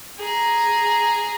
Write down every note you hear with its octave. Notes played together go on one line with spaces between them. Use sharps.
G#4 A#5